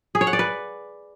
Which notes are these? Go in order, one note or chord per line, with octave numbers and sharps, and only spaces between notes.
G#4
C#5
F#5
D5
B4